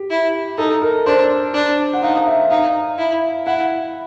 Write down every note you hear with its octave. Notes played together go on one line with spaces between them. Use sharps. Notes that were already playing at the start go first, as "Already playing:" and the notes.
Already playing: G4
E4
D#4 A4
A#4
D4 C5
D4
F#5
D#4 F5
E5
D#4 F5
E4
E4 F#5